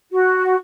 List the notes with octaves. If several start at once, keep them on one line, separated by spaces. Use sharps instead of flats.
F#4